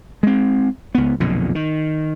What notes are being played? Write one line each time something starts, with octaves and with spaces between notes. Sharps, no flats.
G#3 C4
C#2 B3
B1 F2 A#2 D3
D#3